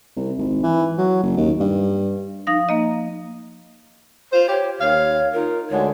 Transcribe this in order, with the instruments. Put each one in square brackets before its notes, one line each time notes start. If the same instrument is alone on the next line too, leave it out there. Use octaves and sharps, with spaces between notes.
[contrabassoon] C2
G#1
E3
F#3
F#1
D#2
G2
[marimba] F3 D#4 F5 D#6 A#6
A#3 D#5
[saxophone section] F4 C5
[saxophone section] G4 [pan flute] C#5
[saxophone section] D#2 F5 [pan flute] C#5
[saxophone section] D#4 F4 [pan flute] A#4
[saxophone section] D2 D3 G#3 [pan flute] C#5